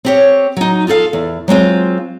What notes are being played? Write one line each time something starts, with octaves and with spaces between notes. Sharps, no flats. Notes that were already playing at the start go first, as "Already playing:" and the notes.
C4 G4 C#5
F#3 D#4
F4 G#4 A4 F5
E2
F#3 G#3 C4 F4